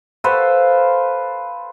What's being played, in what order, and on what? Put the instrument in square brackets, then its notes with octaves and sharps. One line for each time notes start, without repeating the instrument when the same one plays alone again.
[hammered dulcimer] A4 B4 C5 F5